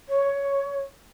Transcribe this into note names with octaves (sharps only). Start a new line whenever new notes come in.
C#5